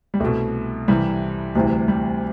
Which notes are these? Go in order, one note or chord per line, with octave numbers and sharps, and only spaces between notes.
G3
C2 B2 A3
C2 C3 E3 G3
D2 C3 E3 G3
G3